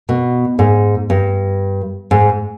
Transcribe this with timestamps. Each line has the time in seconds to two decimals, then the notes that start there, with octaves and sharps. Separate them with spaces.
0.09 B2
0.59 G#2
1.10 G2
2.11 G#2